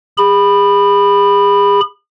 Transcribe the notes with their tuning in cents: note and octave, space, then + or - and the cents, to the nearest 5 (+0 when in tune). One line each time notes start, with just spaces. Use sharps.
G#4 -40 B5 +0